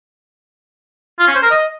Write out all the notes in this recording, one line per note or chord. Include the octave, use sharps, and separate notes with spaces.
F4
C#4
C5
A#4
D#5